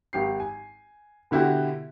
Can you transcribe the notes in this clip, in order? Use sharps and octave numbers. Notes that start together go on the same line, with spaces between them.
G#1 G4 C7
G#5
B2 D3 E4 F#4 G4